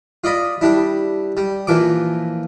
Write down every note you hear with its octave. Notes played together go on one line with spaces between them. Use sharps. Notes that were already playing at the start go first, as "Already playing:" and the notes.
F4 D5 D#5 B5
G3 D4 E4
G3
A#2 E3 F3 D6